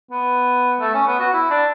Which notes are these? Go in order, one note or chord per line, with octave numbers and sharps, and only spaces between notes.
B3
A3
C#4
B3
F#4
E4
D4